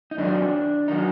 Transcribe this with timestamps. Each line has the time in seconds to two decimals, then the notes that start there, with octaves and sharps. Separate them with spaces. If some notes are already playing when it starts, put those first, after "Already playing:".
0.11 D#4
0.18 F#2 D#3 F#3 D4
0.88 D#3 F#3 D#4